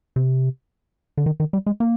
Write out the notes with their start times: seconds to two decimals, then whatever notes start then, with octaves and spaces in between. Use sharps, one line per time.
0.16 C3
1.18 D3
1.26 D#3
1.40 D#3
1.53 G3
1.66 G#3
1.80 A#3